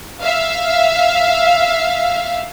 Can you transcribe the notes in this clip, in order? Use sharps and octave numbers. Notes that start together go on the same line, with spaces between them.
E5 F5